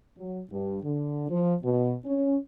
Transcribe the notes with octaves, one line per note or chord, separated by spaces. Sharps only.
F#3
G2
D3
F3
B2
C#4